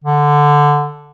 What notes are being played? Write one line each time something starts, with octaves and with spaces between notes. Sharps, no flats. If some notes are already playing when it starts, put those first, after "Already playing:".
D3